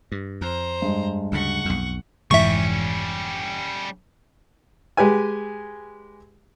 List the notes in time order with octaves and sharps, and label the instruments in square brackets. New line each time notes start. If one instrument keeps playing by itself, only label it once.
[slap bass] G2
[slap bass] F2 [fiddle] C5 A#5
[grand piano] G2 G#3
[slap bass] D2 C#3 [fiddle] F#5 C#6
[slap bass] B1 F2
[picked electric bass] F1 G#2 E3 [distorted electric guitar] G3 C#4 [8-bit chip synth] E5 C#6
[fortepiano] G#3 G4 B4 G#5